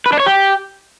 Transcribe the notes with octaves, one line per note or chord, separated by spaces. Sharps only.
B4
D4
C#5
G4